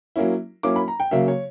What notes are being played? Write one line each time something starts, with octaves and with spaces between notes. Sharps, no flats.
F#3 A#3 C#4 E4
F#3 A#3 C#4 E4 D6
B5
A#5
G5
C#3 F#3 A#3 E5
C#5